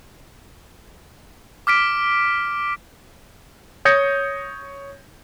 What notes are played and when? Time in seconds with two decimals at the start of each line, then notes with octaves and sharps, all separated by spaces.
1.67 D6 F6 B6 D7
3.85 C#5 D#6 G6 G#6 A#6 C#7